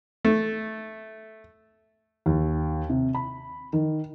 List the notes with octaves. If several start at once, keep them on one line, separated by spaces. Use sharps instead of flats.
A3
D#2
C3
B5
D#3